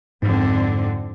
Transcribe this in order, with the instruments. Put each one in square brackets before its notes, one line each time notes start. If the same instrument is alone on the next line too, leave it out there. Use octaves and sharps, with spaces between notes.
[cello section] F2 D3 C4 [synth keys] G#2